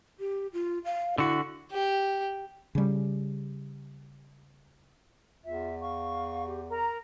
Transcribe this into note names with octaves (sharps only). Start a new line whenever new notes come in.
G4
F4
F5
D3 E4 F#4
G4
C#3 G3
E2 F4 E5
F5 C#6
G4
A#4 A#5